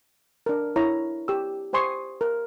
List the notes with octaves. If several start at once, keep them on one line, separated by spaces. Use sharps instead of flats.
D4 A#4
E4 C#5 A#5
G4 E6
G4 C5 G#5 C6 C#6 D#6
A#4